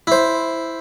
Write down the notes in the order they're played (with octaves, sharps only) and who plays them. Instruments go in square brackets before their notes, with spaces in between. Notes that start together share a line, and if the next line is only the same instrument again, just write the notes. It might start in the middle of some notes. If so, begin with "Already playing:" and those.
[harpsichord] E4 C5